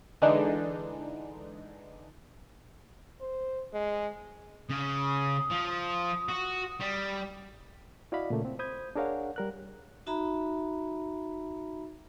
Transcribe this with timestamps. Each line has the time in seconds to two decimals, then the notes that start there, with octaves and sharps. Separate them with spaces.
0.22 D3 E3 G#3 D4 D#4
3.21 C5
3.73 G#3
4.70 C#3 D#6
5.50 F3
6.29 F#4
6.80 G3
8.12 E4 F#4 D5 D#5 F5 B5
8.30 A#2 C#3 A3 A#3
8.45 C4
8.59 C5 B5 D#6 G6 G#6
8.96 D4 G#4 A#4 C#5 F5 F#5
9.36 G3 A#4 F#6
10.06 D#4 F#4 E5 A#5 B5